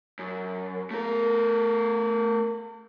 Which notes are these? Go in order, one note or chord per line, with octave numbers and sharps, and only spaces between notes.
F#2
A3 A#4